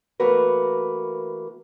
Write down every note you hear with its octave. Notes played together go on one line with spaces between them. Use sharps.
E3 A3 A#3 F#4 A#4 B4